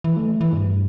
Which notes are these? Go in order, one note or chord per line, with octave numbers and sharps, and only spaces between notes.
E3
A3
E3
G2